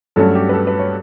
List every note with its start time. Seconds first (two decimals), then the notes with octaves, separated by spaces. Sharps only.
0.16 G2 F#3 A3 C#4 A4
0.35 G4
0.49 B4
0.53 A4
0.67 B4
0.79 C#5